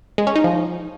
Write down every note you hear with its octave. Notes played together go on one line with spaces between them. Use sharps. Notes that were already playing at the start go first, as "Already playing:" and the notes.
G#3
C#4
D#4
F3